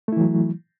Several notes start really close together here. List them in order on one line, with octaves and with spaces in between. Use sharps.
A3 E4 E3 F#3